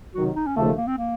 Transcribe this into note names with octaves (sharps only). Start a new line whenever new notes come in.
C3 D#3 F#3 F#4
D#4
C#4
D#2 C#3 F3 A3 A#3
A#3
C4
A#3